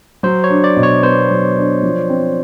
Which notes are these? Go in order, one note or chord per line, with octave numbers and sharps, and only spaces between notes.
F#3 C5
C#5
D4
D5
B2
C#5
B3 C5
F#3
D4
F3
C4